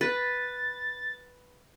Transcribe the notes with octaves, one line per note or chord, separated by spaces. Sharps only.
B4 A6